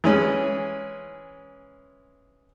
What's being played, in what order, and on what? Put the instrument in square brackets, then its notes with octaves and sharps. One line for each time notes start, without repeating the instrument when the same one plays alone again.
[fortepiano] E3 G#3 C#4